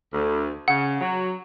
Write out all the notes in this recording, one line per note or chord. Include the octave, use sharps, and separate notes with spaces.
D2
C#3 F#5
F#3